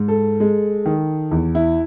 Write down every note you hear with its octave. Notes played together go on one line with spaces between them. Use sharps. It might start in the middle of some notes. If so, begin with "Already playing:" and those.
Already playing: G#2
A4
G#3
D#3
E2
E4